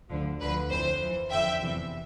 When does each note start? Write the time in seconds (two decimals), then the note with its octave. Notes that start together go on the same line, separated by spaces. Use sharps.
0.09 D2 D3 F3
0.41 D2 D3 F3 B4
0.70 F2 E3 C5
1.01 F2 E3
1.31 F2 D3 F3 E5 G5
1.61 E2 C3 E3